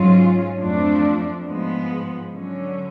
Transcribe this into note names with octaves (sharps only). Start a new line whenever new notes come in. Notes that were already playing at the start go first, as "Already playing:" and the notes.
Already playing: G#2 F#3 C#4 F4
F2 F3 A3 D4
G#2 F3 G#3 B3
D3 F#3 C#4